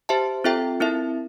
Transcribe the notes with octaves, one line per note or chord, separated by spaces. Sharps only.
G4 C5 E5 A5
C4 F4 A4 E5 G5
C4 E4 A#4 E5